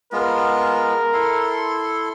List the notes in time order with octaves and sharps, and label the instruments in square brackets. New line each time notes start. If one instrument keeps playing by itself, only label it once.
[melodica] G#3 B3 F4 [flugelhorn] A#4
[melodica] E4 A4 C6